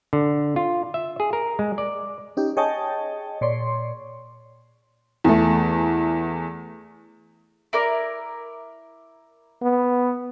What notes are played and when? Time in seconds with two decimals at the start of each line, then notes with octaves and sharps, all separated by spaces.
0.13 D3
0.56 F4
0.94 E5
1.20 G#4
1.33 A#4
1.59 G#3
1.78 D5
2.37 C#4 D#4 G4
2.57 G#4 C#5 D#5 G5 A5
3.41 A#2 C#5 D5 C6
5.24 E2 A3
7.73 E4 A#4 D5
9.62 B3